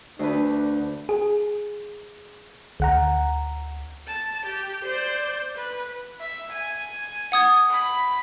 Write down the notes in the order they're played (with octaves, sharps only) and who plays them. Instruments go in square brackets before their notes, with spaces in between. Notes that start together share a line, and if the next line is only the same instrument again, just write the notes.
[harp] D2 B4 [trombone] D4
[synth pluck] G#4
D2 F#5 A#5
[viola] A5
G4
C5 D5
B4
[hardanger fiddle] E5
G#5
[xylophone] F#5 D#6 G#6
[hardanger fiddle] B5